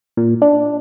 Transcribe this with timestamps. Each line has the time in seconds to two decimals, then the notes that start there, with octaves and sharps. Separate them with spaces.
0.17 A#2
0.42 D4